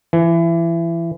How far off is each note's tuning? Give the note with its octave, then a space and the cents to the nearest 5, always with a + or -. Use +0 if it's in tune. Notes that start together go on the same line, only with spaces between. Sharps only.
E3 +25